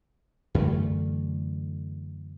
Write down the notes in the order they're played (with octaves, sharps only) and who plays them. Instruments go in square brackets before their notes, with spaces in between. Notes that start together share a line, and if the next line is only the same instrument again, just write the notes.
[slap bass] F#2 D3 E3 A3